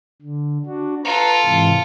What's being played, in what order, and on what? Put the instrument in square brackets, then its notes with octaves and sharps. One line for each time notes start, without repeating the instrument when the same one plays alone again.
[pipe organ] D3
D4 F#4
[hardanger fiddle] F4 A4 [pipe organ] B4 A#5
[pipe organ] G#2 C3 E3